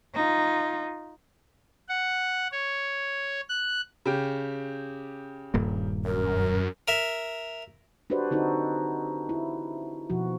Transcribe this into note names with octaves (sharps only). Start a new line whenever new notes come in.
D#4 F4
F#5
C#5
F#6
C#3 G4
D#1 G2 A#3
F#2 A#4
A#4 E5
D4 F#4 G4 B4 C5 D5
D3 C4 D#4 F#4 A4
E4
B2 F3 F#4